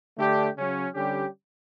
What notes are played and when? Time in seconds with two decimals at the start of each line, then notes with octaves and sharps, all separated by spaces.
0.18 D3 A3 D4 G4
0.57 C#3 F#3 C#4
0.95 D3 G3 C#4 G4